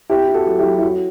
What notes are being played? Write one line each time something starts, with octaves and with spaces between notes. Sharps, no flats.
C4 E4 G4
E4
F#4 A4
F#3
E4 G4
F#3
E4
F#3 F#4